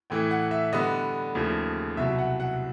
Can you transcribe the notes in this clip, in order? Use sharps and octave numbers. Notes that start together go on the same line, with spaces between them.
A2 E3 A3 G5
F#5
E5
D3 G3 B3 D#5
D#2 C#3 F3 A3
C2 B2 F#3 E5
F#5
F#5